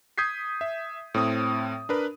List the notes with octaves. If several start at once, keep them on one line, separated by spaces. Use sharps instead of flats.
D#6 G6 G#6 B6 C7
E5
A2 C4 D#6
D4 A#4 B4